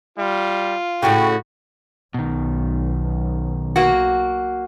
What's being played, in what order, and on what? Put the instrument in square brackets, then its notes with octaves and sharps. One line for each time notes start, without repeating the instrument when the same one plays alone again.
[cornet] G3 [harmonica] F4
[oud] A2 C#3 [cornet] F#4 [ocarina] G5
[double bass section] B1 [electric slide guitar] B2 D#3
[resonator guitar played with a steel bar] A#3 F#4